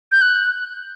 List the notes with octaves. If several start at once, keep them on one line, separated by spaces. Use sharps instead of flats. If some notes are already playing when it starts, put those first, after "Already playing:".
G6
F#6